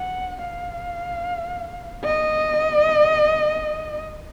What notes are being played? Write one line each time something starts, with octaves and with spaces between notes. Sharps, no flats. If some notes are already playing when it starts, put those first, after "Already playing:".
Already playing: F#5
F5
D#5